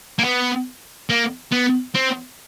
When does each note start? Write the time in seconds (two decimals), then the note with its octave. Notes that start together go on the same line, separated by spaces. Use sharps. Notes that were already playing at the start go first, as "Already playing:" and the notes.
0.19 A#3
0.24 B3
1.10 A#3
1.52 B3
1.95 C4